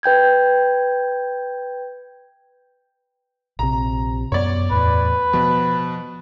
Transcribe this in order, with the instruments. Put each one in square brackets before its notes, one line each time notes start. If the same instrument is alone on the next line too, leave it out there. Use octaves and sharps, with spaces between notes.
[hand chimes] B4 G5 G6 G#6
[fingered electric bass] A#1 C3 [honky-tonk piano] A#5
[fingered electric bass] F#2 B3 [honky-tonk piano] C#5 D5
[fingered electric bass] E2 A2 [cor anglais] B4
[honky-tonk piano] B2 [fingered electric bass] F3